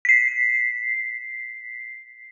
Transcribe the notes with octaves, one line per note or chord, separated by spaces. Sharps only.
B6 C7